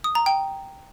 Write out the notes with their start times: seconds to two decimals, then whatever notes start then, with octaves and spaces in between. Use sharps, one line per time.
0.04 D#6
0.15 A#5
0.26 G5